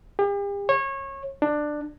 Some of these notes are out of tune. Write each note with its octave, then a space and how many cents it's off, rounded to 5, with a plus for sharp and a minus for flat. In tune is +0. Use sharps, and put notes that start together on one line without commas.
G4 +40
C#5 -25
D4 +15